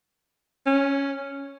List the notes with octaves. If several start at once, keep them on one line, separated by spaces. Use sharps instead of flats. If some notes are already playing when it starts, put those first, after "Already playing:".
C#4